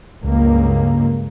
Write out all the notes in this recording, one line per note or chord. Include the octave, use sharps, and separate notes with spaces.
C#2 G2 A#3